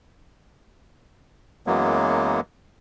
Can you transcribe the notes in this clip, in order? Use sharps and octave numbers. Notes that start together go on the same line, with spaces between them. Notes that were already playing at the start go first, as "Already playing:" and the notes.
F#2 E3 F#3 G#3 A#3 B3